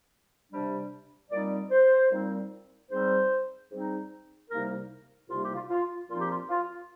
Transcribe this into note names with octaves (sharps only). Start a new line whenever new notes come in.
C3 G3 D4
A#2 G3 C4 D#4 D5
C5
A#2 G3 C4 D#4
G#2 G3 C4 D#4 C5
G#2 G3 C4 D#4
C2 C3 G3 A#3 D#4 A#4
C2 C3 G3 A#3 D#4 F4
G4
F4
F4
A#2 F3 C4 D#4 F4
G4
F4
F4